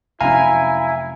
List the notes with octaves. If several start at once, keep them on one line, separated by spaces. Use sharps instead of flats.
F1 F#2 C#4 E4 F5 G#5 A#5